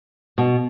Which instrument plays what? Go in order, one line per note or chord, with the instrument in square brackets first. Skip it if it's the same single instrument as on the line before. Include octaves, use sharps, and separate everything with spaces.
[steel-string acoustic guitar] B2